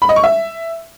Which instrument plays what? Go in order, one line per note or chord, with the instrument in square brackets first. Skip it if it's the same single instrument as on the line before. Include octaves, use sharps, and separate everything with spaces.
[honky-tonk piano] B5
D#5
C#6
E5